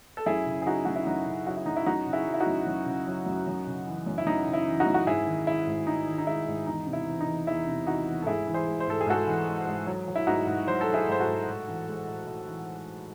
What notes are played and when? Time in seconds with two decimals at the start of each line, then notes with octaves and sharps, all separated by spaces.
0.17 A4
0.26 F#2 E4 G#4
0.46 C#3
0.62 G#4
0.66 F#3 D#4 F#4
0.85 F#2 F#4
0.96 E4
1.06 F#2 D#4
1.27 C#3
1.47 F#3 F#4
1.57 E4
1.66 F#2 D#4
1.76 E4
1.86 F#2 D#4 F#4
2.06 C#3
2.13 E4 G#4
2.27 F#3
2.34 E4
2.40 D#4 F#4
2.46 F#2
2.66 F#2
2.86 C#3
3.07 F#3
3.26 F#2
3.47 F#2
3.67 C#3
3.87 E3
4.06 F#2
4.18 E4
4.26 F#2 D#4
4.47 C#3
4.53 E4
4.67 E3
4.80 D#4 F#4
4.86 F#2
4.94 F#4
5.07 G#2 E4 G#4
5.26 D#3
5.46 G#3 E4
5.67 G#2
5.87 G#2 D#4
6.07 D#3
6.18 D#4
6.26 G#3 E4
6.47 G#2
6.66 E2 D#4
6.87 C3
6.93 E4
7.07 E3
7.21 D#4
7.27 E2
7.47 E2 E4
7.67 C3
7.87 E3 D#4 F#4
8.07 E2
8.22 A4
8.26 G#2 E4 G#4
8.47 E3
8.54 G#4 C5
8.67 G#3
8.80 C5
8.88 G#2 A4
9.01 G#4
9.06 G#2 F#4 A4
9.27 E3
9.48 G#3
9.67 G#2
9.87 F#3
10.08 F#3
10.16 E4
10.27 G#2 D#4 F#4
10.47 G#2
10.67 F#3 C5
10.81 A4
10.88 F#3
10.94 E4 G#4
11.07 G#2 C5
11.20 F#4 A4
11.27 G#2
11.47 A2
11.68 E3
11.88 G#3
12.07 A2
12.27 A2
12.47 E3